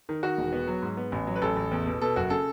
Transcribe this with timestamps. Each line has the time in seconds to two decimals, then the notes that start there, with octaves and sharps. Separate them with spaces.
0.09 D#3
0.23 D#3 F#4
0.38 E1
0.52 B3
0.68 F#3
0.82 G#2
0.97 B3
1.12 A1
1.27 F#3
1.36 B4
1.42 A1 A4
1.56 A1
1.71 E2
1.86 B2
2.01 B2 A4
2.16 F#1 F#4
2.30 C#3 A4